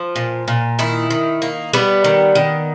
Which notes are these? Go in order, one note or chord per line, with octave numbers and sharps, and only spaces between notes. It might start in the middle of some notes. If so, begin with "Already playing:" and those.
Already playing: F3
A#2
A#2
D#3 E4
D#3
A#3
G3 B3
D#3
D#3